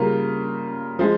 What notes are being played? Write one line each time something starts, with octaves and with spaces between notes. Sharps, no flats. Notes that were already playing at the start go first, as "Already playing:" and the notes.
Already playing: C#3 G3 A#3 F4 A#4
F3 G#3